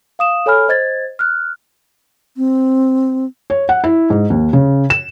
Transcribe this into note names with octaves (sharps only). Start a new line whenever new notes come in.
F5 D#6 E7
A4 C#5 G#5 B5 F6
C5 D#5 G#6 A6
F6 F#6
C4
C#5
F#5
E4
G#2
D#2
C#3
E7